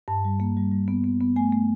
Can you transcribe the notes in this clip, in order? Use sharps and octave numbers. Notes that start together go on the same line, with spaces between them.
G2 A5
G3
A#3
G3
G3
B3
B3
B3
A3 G#5
A3